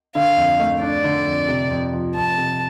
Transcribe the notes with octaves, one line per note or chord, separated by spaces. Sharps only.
D3 F5
F2
A3
D4 D5
D3
F2
C3
F2
F3
F2 A5
C3